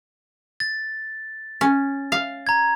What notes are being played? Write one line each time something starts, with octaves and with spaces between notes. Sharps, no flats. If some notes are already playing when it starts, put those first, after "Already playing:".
A6
C#4
F5
A#5 G#6